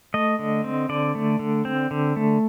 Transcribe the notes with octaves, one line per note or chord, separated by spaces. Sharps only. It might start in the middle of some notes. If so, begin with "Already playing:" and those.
A3 D#5
D3
C4
D3 D5
A3
D3
C4
D3
A3